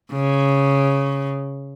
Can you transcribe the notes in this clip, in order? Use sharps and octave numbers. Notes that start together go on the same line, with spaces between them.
C#3